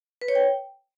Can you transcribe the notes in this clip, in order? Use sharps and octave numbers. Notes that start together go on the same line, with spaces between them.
B4
C#5
G5